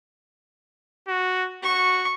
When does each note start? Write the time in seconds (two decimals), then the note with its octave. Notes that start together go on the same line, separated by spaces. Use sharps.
1.08 F#4
1.63 F#4 C#6